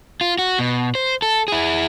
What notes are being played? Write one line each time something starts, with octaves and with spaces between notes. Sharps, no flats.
F4
F#4
B2
C5
A4
E4 G#4